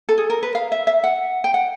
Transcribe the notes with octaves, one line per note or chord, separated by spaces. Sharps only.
A4
G#4
A#4
B4
F5
E5
E5
F#5
G5
F#5